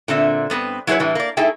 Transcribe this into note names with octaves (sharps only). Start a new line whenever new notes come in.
A#2 D3 C4 E5
G2 B3 C4 B4
F#3 E4 G#4 A4 B4 C#5
A2 E3 G3
A#3 D5
A3 D#4 E4 G#4 A4 G5